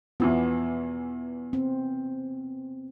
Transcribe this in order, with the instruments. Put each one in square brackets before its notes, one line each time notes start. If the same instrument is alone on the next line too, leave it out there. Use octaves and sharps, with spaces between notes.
[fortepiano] E2 E3 F3 [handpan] B3
[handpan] C4